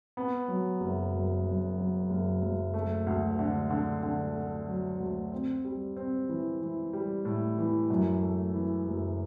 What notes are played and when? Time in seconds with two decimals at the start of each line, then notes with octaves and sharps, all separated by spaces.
0.17 B3
0.48 F#3
0.81 F#1
1.14 F#2
1.46 F#2
1.78 F#3
2.10 F#1
2.42 F#1
2.74 A3
3.07 D2
3.39 D3
3.70 D3
4.03 D3
4.35 A3
4.68 F#3
4.99 D2
5.32 C4
5.64 G3
5.97 C4
6.29 E3
6.62 E3
6.93 G3
7.25 A2
7.58 E3
7.90 F#2
8.22 A3
8.54 E3
8.86 F#1